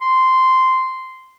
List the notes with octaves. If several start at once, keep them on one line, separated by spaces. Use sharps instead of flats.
C6